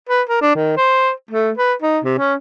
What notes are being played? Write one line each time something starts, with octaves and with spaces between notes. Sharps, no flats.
B4
A#4
D4
D#3
C5
A3
B4
D#4
C3
C#4